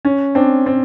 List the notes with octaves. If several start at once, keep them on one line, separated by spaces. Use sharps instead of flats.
C#4
C4 D4
C4